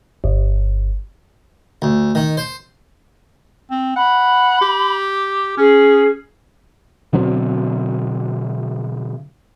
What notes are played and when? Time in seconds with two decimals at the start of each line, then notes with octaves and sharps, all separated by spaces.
0.24 G1
1.82 D2
2.15 D#3
2.37 C5
3.71 C4
3.96 F#5 B5
4.61 G4
5.57 C#4 G#4
7.13 B2 D3 F#3 C4